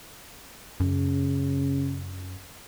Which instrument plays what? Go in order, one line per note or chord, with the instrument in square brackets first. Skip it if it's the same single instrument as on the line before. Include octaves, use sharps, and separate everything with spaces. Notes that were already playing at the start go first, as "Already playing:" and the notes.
[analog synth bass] F#2 [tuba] C#3